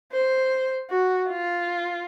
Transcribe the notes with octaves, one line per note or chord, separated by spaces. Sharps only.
C5
F#4
F4